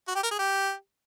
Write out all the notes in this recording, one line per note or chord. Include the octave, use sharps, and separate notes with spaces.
F#4
G4
A#4
G#4
G4